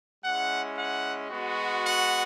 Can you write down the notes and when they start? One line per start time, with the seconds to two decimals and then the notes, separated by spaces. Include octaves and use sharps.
0.24 G#3 C#4 E4 F#5
0.77 F#5
1.31 G#3 B3 F#4
1.84 F#5